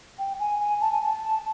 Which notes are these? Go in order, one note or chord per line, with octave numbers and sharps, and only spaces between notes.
G5
G#5
G#5
A5
G#5
A5